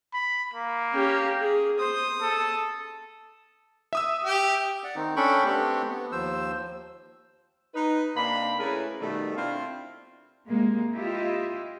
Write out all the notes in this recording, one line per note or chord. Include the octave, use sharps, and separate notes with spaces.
B5
A#3
C#4 G4
G#4
C5 D#6
A4
E5 D#6 E6
G4
D5 F#5
D#3 C4 D#4
C#4 D4 A4 G5 B5 C#6
A3 B3 C4 D4 G4 A4
B3
D#2 F3 C5 E6
D#4 B4
C3 A#3 D4 B5
A3 C#4 E4 G#4 A#4 B4
B2 D#3 G3 A3
C4 D4 E4 F4
C3 G#3 A#3
E4 F4 G4 D#5 E5